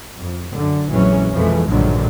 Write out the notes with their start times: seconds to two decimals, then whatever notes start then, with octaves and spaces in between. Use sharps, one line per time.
0.16 F2
0.49 F#2 D3
0.90 A#1 F2 E3 F#3 G#3 C#4
1.34 F2 B2 E3 F3 G#3 A3
1.68 A#1 G2 A#2 D3 D#3 F#3